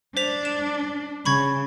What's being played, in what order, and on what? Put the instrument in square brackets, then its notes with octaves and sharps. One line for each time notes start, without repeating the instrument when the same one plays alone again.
[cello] D4 [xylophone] C5 B6 F7
[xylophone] E7
[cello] C#3 [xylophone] B5 C#6 G#6